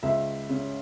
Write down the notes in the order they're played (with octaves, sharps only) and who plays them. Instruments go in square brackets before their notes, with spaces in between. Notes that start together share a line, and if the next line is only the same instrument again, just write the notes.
[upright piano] C#2 E5
C#3